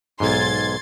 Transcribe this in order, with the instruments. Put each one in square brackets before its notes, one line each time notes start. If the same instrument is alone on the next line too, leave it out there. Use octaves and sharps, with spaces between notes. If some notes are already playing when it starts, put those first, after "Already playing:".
[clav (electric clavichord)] B1 G#2 [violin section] C6 G#6 A6